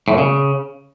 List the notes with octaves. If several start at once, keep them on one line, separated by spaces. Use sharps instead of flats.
A2
A#2
C#3